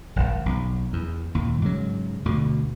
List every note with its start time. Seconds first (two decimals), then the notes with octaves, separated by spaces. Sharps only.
0.16 D#1 G#1
0.46 B1
0.93 E2
1.35 D#2 A#2
1.62 G#2 C#3 F#3
2.26 D2 B2 D3